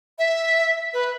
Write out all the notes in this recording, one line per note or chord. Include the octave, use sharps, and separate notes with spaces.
E5
B4